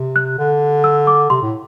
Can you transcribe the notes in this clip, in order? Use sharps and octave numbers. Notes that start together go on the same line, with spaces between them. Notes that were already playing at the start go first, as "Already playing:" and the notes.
Already playing: C3
F#6
D3
E6
D6
C3 C6
A2